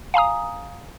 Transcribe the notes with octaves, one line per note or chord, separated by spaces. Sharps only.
F5 G#5 A#5 D#6